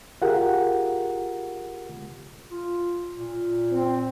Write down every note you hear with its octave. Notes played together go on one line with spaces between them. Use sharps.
F4 G4 G#4 A#4 F#5
F4
A#2
C4